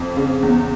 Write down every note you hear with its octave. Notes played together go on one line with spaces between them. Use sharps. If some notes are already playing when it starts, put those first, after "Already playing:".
Already playing: F2
C#3
E2